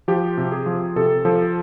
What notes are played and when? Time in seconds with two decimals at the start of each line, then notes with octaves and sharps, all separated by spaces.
0.08 F3 G4
0.38 C3
0.52 G#4
0.66 F3
0.96 C3 A4
1.25 F3 A4